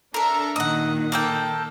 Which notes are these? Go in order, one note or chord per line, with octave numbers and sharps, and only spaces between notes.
D4 A4 A#4 E5 A#5
A#2 D#3 D#5 F#5
A#3 A4 G5